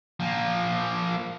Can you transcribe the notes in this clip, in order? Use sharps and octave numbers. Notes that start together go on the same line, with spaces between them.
F3 A#3